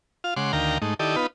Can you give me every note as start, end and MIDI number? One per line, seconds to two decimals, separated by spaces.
0.24 0.34 65
0.24 0.34 77
0.37 0.52 49
0.37 0.52 56
0.37 0.52 78
0.37 0.52 84
0.37 0.52 86
0.53 0.78 38
0.53 0.78 51
0.53 0.78 70
0.53 0.78 77
0.53 0.78 79
0.53 0.78 82
0.82 0.94 44
0.82 0.94 57
0.82 0.94 63
0.99 1.16 51
0.99 1.16 64
0.99 1.16 67
0.99 1.16 69
0.99 1.16 74
0.99 1.16 75
1.16 1.27 59
1.16 1.27 63
1.16 1.27 65
1.16 1.27 71